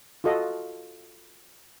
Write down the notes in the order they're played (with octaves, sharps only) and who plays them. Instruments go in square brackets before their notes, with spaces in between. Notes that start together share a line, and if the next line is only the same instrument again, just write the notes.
[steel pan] F4 F#4 A4 D#5